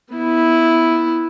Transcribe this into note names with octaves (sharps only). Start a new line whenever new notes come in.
B3 E4